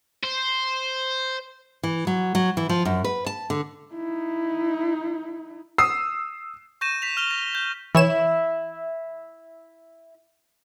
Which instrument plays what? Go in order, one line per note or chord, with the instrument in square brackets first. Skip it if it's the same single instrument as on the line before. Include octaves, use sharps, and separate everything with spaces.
[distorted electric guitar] C5
[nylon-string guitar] E3
F#3
F#3
E3
F3
F#2
B4
A5
D3
[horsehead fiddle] D#4 E4
[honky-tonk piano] D#6 E6 C7
[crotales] C#6 G6 A#6 D#7 E7
B6 F7
F6 F7 G7
A#6
G6
[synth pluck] E3 C#5 E7 [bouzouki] E4